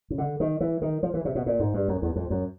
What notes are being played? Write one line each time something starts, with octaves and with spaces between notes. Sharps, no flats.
C#3
D3
D#3
E3
D#3
F3
E3
C3
B2
A#2
G#2
G2
F#2
E2
F2
F#2